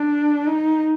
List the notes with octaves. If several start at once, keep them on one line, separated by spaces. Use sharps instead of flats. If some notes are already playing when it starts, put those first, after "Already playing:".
Already playing: D4
D#4